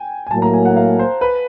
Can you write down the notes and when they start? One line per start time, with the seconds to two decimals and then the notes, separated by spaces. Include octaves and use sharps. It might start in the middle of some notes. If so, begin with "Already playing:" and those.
Already playing: G5 G#5
0.27 G#5
0.31 A2 F#3 A#3 A5
0.42 A#5
0.54 G#5
0.65 F#5
0.76 F5
0.99 C5
1.21 B4